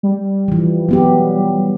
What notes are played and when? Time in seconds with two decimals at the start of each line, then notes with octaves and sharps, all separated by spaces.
0.03 G3
0.48 E3 F3
0.89 F#3 B3 G4